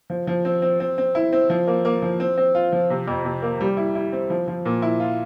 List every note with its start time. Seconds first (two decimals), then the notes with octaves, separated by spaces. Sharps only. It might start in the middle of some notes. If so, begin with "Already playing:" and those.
0.10 F3
0.27 F3
0.45 C4
0.62 C4
0.80 C4
0.98 C4
1.15 E4
1.33 C4
1.50 F3
1.67 A#3
1.85 A#3
2.02 F3
2.20 C4
2.38 C4
2.55 F4
2.72 F3
2.90 C3
3.08 F2
3.25 C3
3.42 A#3
3.61 G3
3.77 E4
3.95 E4
4.13 C4
4.30 F3
4.48 F3
4.65 A#2
4.82 E4
5.00 F4